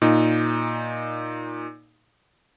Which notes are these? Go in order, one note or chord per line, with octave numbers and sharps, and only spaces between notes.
A#2 D#4